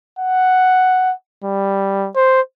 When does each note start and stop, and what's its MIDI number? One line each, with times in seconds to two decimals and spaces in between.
0.19 1.12 78
1.44 2.09 55
2.15 2.41 72